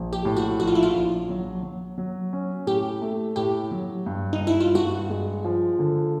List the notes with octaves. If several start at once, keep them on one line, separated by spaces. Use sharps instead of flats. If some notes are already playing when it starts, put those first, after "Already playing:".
Already playing: A#1
G4
A2
F#4
A#1 F#4
F4
E4
F4
A#1
F#3
F#3
F#3
C#4
A2 G4
A3
A2 G4
F#3
G2
D#4
G2
E4
F4
G2 F#4
G#3
F3
D3